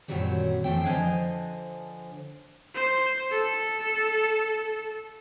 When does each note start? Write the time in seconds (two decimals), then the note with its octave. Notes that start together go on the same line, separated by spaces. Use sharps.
0.08 F#2 A#2 D#3 F#3 G3 C4
0.64 F2 E3 A3 C4 G5
0.85 D3 F3 D4 C5 D#5 G#5
2.74 C5
3.32 A4